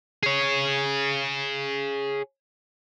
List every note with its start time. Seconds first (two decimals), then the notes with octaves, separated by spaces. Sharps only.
0.23 G#4 C#5